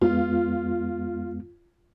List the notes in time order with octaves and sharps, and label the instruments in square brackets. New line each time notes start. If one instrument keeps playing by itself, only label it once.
[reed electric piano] F2 G#3 B3 [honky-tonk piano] F4